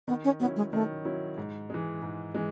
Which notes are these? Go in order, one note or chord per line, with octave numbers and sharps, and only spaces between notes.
D#3 B3
C#4
F#3 B3 C#4 E4
G#3
D#3 A3
F#3 C#4 E4
G#2
E3 G#3
G#2
E3 G#3